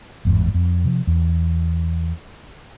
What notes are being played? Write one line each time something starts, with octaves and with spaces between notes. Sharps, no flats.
G1 E2 G#2
F2
C3 F3
E2